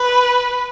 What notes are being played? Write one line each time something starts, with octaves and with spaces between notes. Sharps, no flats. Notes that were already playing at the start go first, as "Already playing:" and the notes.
Already playing: B4